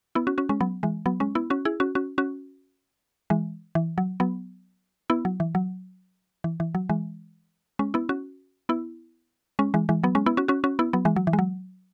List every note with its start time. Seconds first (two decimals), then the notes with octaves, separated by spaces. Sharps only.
0.15 B3 E4
0.27 C#4 F#4
0.38 C#4 F#4
0.49 G#3 C#4
0.60 F#3 B3
0.83 E3 G#3
1.06 F#3 B3
1.20 G#3 C#4
1.35 B3 E4
1.50 C#4 F#4
1.65 E4 G#4
1.80 C#4 F#4
1.95 C#4 F#4
2.18 C#4 F#4
3.30 E3 G#3
3.75 E3
3.98 F#3
4.20 F#3 B3
5.10 B3 E4
5.25 F#3
5.40 E3
5.55 F#3
6.44 E3
6.60 E3
6.75 F#3
6.89 E3 G#3
7.79 G#3 C#4
7.94 B3 E4
8.09 C#4 F#4
8.69 B3 E4
9.59 G#3 C#4
9.74 E3 G#3
9.89 E3 G#3
10.03 F#3 B3
10.15 G#3 C#4
10.26 B3 E4
10.37 C#4 F#4
10.48 C#4 F#4
10.64 C#4 F#4
10.79 B3 E4
10.93 F#3 B3
11.05 E3 G#3
11.16 F#3
11.27 E3
11.33 G#3
11.39 F#3